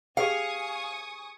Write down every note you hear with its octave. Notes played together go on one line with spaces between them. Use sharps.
G4 G#4 F5 G5 G#5 C#6 D#6